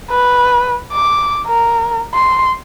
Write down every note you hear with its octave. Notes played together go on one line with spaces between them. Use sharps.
B4
D6
A#4
C6